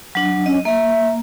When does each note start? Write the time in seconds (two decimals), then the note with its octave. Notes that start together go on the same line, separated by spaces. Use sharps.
0.15 F#3 D4
0.46 C#4 D#5
0.65 A#3 E5